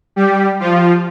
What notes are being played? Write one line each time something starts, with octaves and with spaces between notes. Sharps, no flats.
G3 G4
F3 F4